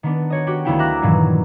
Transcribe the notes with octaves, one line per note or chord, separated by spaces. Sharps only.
D#3 B3 D4
F#4 C#5 D#5
F#4 G4
D2 D#3 B3 E4 F5 G5
E5 A#5 D6 F#6 A#6
G2 A#2 D#3 E3 F#3